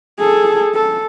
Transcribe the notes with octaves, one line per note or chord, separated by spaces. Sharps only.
G#4 A4
A4